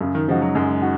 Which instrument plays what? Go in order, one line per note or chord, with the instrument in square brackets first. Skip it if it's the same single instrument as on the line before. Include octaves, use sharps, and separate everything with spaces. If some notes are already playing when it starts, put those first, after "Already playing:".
[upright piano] F#2 [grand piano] C#3
[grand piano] D#3
[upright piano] C#3 G#3 D#4 F#4 [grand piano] F3
[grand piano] F#3
[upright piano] F#2 [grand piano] G#3
[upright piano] D#4 F#4